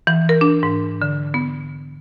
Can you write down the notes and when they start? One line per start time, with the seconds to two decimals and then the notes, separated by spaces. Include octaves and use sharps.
0.07 E3
0.29 A#4
0.41 D4
0.63 G#2
1.02 D3
1.34 B3